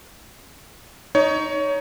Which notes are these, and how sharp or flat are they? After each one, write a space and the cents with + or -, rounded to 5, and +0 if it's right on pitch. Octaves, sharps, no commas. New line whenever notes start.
D#4 +0 C#5 +20